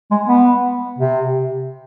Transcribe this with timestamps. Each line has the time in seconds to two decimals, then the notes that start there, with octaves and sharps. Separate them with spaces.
0.11 G#3
0.28 B3
0.99 C3